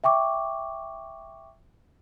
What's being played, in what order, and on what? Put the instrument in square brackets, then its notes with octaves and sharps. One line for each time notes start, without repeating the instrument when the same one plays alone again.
[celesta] E5 G5 C#6 D6